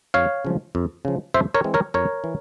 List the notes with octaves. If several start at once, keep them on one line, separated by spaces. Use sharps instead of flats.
F2 C#5 F5
C#3 F3
F2
C#3 F3
F2 C5 E5
A#4 C#5
E3 G#3 C4
A#4 C#5
F2 A#4 C#5
E3